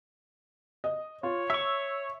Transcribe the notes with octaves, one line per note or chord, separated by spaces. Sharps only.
D#5
F4 C#5
E5 C#6 E6